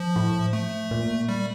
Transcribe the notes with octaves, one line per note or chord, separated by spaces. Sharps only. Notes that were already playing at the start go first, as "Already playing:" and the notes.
Already playing: F3
A2
A3
A#2
G3